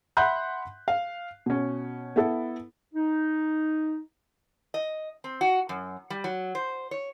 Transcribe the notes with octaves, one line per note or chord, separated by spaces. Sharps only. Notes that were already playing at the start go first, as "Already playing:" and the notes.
E5 F#5 B5 C6 F#6 G6
F5
B2 C#4
B3 E4 A4
D#4
D#5
C4
F#4
F#2
G3
F#3
C5
C#5